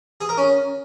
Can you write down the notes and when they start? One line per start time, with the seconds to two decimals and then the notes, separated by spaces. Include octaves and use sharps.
0.21 G#4
0.29 A#4
0.37 C#4